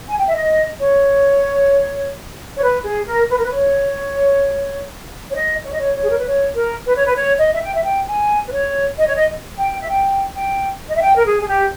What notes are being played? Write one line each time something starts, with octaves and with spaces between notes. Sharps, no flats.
G#5
G5
E5
D#5
C#5
C#5
B4
G#4
A#4
B4
A#4
B4
C#5
C#5
D#5
C#5
D#5
C#5
C#5
G#4
A#4
B4
C#5
A#4
B4
C#5
B4
C#5
D#5
E5
G5
E5
G5
G#5
B4
C#5
D#5
C#5
D#5
G5
E5
G5
G5
D#5
E5
G5
A#4
G#4
G#4
G4